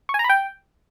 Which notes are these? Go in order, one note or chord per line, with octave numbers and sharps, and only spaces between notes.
C#6
G#5
A#5
B5
G5